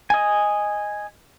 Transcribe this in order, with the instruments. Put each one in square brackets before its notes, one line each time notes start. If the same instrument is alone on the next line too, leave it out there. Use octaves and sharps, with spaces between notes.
[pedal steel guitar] D#5 G#5